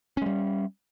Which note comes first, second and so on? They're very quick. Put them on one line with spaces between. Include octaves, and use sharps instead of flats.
C#4 G#3 G3